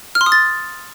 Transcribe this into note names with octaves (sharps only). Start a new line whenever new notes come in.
F6
C6
D#6
A6